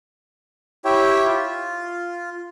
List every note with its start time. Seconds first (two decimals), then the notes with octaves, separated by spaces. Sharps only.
0.85 E4 G4 C#5 E5 G5
1.27 F4